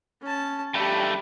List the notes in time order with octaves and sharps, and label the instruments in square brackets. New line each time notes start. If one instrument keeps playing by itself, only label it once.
[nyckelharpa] C#4 A5
[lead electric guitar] G2 A3 [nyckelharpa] G4 B5